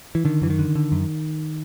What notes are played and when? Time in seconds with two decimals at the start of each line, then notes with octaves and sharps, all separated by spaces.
0.15 E3
0.25 D3 D#3
0.42 F#2 E3
0.50 D#3
0.59 D3
0.75 D3
0.92 F#2